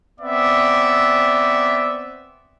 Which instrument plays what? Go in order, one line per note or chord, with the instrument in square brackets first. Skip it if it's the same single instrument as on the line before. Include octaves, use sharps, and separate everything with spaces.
[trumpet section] B3 C4 D5 E5